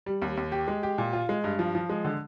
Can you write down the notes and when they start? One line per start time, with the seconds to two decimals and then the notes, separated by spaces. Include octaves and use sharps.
0.06 G3
0.22 D#2
0.37 D#2
0.52 G4
0.68 G#3
0.83 G4
0.98 A#2
1.13 F4
1.29 G#3
1.44 G2
1.59 F3
1.75 F3
1.90 G#3
2.05 D3